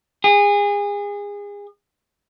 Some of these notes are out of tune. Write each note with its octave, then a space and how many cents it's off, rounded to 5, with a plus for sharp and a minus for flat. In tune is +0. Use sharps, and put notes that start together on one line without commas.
G#4 -30